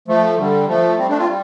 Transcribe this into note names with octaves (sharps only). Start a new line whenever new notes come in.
F3 A3
D3 G3
F3 A3
G3 C4
A3 D4
C4 F4
G3